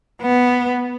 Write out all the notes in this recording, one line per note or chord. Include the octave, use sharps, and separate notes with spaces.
B3